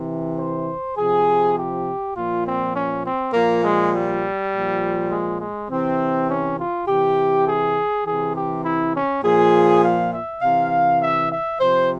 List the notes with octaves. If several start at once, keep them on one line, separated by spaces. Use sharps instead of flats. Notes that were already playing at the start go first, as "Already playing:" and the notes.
Already playing: C3 E3
C5
C3 F3 G#4
G4
A#2 F3 F4
C4
C#4
C4
A#2 F3 A#3
G#3
G3
A#2 F3
G#3
G#3
C3 E3 C4
C#4
F4
C3 E3 G4
G#4
C3 E3 G#4
G4
E4
C#4
A#2 F3 G#4
F5
E5
C3 E3 F5
E5
E5
C3 F3 C5